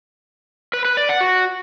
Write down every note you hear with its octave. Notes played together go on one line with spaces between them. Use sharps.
B4
B4
D5
F#5
F#4